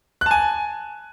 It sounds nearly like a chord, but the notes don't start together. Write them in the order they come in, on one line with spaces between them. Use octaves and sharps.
F#6 A5 G#5